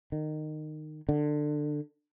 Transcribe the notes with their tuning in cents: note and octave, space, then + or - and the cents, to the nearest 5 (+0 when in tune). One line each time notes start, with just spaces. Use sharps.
D#3 -20
D3 +20